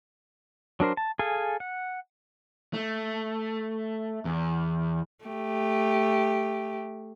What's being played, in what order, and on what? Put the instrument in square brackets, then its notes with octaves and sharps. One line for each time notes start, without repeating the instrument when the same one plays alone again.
[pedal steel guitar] F#3 D4 A#4 C5
A5
G#4 A4 F5 G#5
F#5
[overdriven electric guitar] A3
E2
[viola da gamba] A3 G4